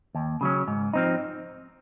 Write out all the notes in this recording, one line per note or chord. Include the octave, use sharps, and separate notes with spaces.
D#2
C#3 F#3 C#4
G#2
F3 C4 D#4